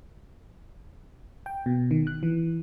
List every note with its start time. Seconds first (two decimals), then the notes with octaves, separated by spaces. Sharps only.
1.46 G5
1.66 B2
1.91 D#3
2.07 F#6
2.23 E3